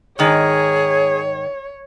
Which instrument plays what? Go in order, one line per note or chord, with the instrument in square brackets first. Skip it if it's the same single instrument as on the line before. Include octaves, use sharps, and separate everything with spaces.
[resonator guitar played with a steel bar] G#2 D#3 [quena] G#4 [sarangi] C#5